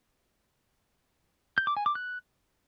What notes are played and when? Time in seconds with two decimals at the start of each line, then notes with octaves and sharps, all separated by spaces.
1.58 G6
1.67 D6
1.77 G#5
1.86 D6
1.95 F#6